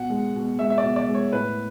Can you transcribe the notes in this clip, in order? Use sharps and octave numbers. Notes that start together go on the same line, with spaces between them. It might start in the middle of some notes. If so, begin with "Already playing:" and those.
Already playing: B2 F#5
G#3
B2
G#3 E5
E5
D5
B2
D5
G#3
C#5
A2 B4